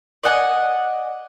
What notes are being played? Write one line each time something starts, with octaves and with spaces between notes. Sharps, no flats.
D5 D#5 F#5 G#5